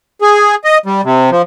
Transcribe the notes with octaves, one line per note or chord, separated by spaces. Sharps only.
G#4
D#5
G3
C3
F3